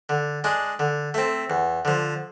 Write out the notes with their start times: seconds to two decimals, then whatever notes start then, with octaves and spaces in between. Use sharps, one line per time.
0.09 D3
0.44 G#3 D4
0.79 D3
1.14 A3 C4
1.50 E2
1.85 D3 F3